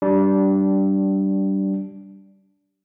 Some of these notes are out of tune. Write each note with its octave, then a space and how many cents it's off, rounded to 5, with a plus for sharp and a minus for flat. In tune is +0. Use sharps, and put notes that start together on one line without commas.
G3 -20 D4 -10